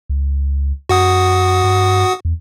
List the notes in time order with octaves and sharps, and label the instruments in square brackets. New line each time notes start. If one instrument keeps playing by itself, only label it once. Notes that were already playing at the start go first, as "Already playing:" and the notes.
[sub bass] C#2
[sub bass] F#2 [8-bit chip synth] F#4 F#5 D#6
[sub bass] G2
E2